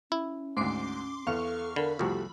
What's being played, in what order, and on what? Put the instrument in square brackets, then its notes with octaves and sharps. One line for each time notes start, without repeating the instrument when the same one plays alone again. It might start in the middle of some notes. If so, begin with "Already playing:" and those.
[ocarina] C#4 [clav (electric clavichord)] E4
[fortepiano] D2 G#2 [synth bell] C6 D6 C7
[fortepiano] E2 [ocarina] A4 [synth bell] F5 C#6 F6
[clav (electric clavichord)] D3 [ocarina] A#4 [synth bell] B5
[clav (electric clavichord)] C2 F2 [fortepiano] F3 A3 F#4 [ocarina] G4